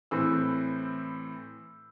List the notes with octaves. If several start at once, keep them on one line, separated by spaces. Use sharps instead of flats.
A2 E3 C4 E6